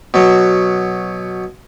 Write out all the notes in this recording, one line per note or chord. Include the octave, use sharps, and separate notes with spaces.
B2 F#3